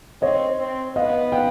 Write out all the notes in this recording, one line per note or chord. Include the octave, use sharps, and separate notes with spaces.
C4 C#5 D#5
C4
B3 D#5 F5
F5 G5